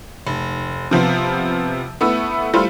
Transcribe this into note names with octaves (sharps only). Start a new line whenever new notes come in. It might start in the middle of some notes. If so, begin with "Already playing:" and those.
F1
C3 F3 B3 F4
A3 B3 E4 E6
G3 A3 E4 F4 C5